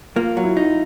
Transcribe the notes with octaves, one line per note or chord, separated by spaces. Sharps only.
A#3 F4
F#3
E4
D#4